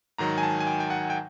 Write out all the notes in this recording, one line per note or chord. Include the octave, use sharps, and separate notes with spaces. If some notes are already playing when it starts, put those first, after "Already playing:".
G#2 D#3 F#3 A#5
G#5
A5
G#5
G5
G5
F#5
G5